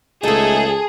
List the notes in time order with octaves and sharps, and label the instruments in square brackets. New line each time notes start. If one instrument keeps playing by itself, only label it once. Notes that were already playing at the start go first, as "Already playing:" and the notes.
[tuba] C#2 [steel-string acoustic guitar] A3 D#4 [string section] G#4 [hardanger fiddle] A4